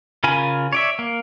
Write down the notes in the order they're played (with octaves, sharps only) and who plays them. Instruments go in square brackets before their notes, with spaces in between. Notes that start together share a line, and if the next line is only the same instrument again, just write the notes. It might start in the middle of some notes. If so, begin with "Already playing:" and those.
[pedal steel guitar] C#3 F4 A#4 G#5 B5
C#5 D5 E5
A#3